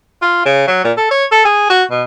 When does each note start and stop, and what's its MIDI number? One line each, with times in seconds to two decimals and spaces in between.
0.22 0.41 65
0.45 0.67 49
0.68 0.80 54
0.84 0.92 46
0.97 1.09 69
1.11 1.25 73
1.32 1.43 69
1.45 1.70 68
1.70 1.84 66
1.91 2.03 47